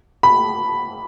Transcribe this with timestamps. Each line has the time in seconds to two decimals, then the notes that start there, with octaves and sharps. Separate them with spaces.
0.23 B5